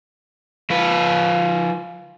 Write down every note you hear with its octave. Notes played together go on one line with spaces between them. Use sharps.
F3 B4